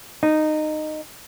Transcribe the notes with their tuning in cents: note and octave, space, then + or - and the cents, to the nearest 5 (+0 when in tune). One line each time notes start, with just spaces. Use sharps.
D#4 -15